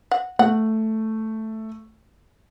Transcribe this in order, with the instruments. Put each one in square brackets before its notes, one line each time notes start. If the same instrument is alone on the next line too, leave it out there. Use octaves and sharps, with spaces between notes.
[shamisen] F#5
[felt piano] A3 [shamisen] F#5